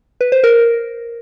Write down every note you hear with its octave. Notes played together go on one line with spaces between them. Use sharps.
B4
C5
A#4